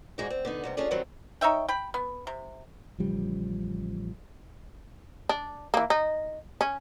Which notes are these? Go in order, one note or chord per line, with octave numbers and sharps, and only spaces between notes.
D#2 G#2 G#3 D#4 F#4 D5
C4
D3 B3 D#4
D#2 C3 G3
C#4 D4 F4 G#4 A4 D5
D#3 E3 F#3 G3 C4
D#4 C#5 E5 G5
G5 B5
B3
C3
A1 C#3 F3 G3
D4
E3 A#3
D#4
C#4